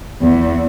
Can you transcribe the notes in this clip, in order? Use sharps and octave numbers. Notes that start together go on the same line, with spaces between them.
E2